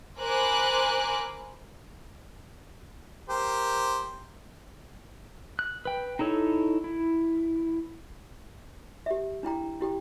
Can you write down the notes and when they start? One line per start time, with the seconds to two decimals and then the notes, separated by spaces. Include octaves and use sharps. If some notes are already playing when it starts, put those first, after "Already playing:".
0.20 A#4 C5 G#5 B5 D6 F#6
3.29 G4 A#4 C5
5.59 F#6
5.85 B4 G5
6.19 D#4 E4 A4 C#5
6.84 E4
9.06 G4 E5
9.43 D4 E4 G5 A#5
9.81 E4 G4 G5